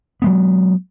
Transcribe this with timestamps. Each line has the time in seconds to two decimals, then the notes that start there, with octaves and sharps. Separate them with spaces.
0.22 F#3 G#3 B3